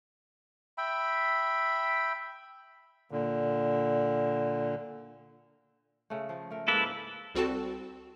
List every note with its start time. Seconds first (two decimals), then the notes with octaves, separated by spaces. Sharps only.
0.78 E5 G5 B5
3.11 A#2 D3
6.10 C#3 A3
6.29 F3
6.50 A3 A#4
6.68 G#2 A#3 E4 A4 B4
7.35 C2 G3 C4 F#4 A4 A5